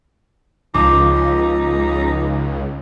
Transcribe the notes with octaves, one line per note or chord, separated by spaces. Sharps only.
C#2 F3 D#4 D6